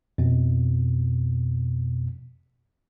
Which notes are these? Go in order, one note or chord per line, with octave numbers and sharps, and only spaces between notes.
F2 B2